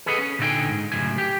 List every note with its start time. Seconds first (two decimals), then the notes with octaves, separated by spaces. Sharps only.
0.06 G#4 A4 B4 D#5 F5 F#5
0.18 C#4
0.39 A#2 D3 D#4 F4 G5 G#5
0.69 G#2
0.92 C#2 F#2 A2 G#5
1.18 G4 G5